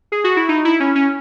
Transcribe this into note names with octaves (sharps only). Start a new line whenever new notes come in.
G#4
F#4
E4
D#4
E4
C#4
C#4